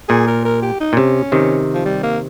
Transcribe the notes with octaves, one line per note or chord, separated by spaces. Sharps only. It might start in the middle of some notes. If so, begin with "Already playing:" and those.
A#2 G#4
A#4
A#4
G4
D#4
A#2
C3 C#4
C3 D#3
F3
G3
A#3